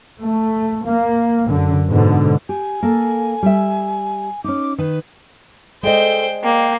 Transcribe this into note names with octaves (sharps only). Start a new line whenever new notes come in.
A3
A#3
F#2 D3
G#2 B2 D3
G4 G#5
A#3 A4
G3 E5
C#4 D#4 D6
D#3 B4
G#3 A4 C5 D5 D#5 G5
A#3 G5